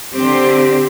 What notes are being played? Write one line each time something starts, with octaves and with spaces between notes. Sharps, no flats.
D3 C4 G4 C5